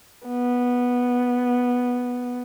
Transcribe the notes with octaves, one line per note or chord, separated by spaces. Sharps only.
B3